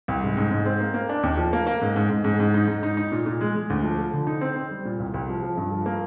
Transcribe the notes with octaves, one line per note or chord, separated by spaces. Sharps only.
C2
G#2
G#2
G#2
C4
A#3
A#3
D4
D#2
F3
A#3
A#3
G#2
G#2
G#2
G#2
G#2
D#4
G#2
D#4
D#4
A#2
A#2
G#3
G#3
D2
F3
F3
D3
D#4
C4
C4
G3
A#2
C2
C2
F3
F3
G2
F3
A#3